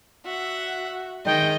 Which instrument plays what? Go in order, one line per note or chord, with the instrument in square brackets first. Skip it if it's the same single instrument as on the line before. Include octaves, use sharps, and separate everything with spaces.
[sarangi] F#4 [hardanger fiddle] E5 F#5
[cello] D#3 [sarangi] G#3 [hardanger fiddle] D#5 [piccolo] G5